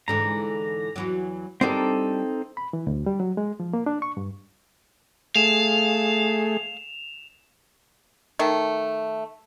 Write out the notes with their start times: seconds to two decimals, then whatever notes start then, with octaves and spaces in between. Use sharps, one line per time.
0.08 G#2 D3 E3 A#5
0.96 E2 E3 F#3
1.61 G3 C4 D4 D#4 A4 A#4
2.57 B5
2.73 E3
2.87 D2
3.06 G3
3.20 F#3
3.37 G#3
3.60 F3
3.73 A#3
3.86 D4
4.02 C#6
4.17 G2
5.36 A3 G#4 F5 E7 F7
8.39 D#3 A3